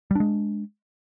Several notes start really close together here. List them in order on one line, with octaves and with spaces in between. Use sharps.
G3 D4 G#3